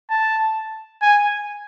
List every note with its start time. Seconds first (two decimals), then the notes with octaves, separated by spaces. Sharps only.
0.10 A5
1.02 G#5